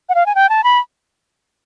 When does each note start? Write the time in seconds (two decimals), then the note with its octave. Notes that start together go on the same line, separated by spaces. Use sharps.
0.09 F#5
0.15 F5
0.26 G#5
0.35 G5
0.49 A5
0.64 B5